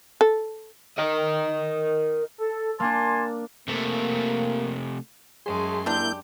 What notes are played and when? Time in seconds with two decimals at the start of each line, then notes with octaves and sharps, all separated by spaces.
0.21 A4
0.99 A#4 D#5
2.39 A4
2.80 A#3 D4 G#5 A5 C6
3.68 C3 A3 A#3
5.46 F#2 G#3 A3 G#4 C6
5.86 G3 A#3 D4 E4 G4 G6